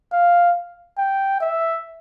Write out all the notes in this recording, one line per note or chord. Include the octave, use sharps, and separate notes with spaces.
F5
G5
E5